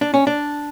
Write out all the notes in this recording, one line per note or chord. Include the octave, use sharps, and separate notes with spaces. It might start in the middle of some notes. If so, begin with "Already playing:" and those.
D4
C#4
D4